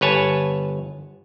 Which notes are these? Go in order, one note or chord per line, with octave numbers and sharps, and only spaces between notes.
G1 B4 C#5 G#5 A5